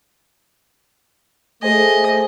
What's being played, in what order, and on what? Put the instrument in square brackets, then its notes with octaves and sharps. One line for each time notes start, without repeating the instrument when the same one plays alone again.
[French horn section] A3 [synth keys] G#4 C5 G#5 [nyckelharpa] D#5